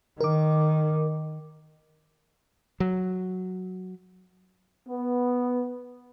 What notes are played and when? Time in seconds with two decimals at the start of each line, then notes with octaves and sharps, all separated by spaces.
0.21 D#3 A#4 D6
2.80 F#3
4.89 B3